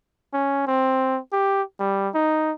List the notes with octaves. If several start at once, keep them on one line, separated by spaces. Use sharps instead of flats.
C#4
C4
G4
G3
D#4